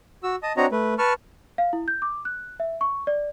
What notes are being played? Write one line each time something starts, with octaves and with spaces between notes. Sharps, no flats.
F#4 E6
D#5 A5 D#6
C4 D4 F#4 C#5 D#5 A#5
A3 B4
B4 A5 C#6 F6
F5
E4
G6
D6
F#6
E5
C#6
D5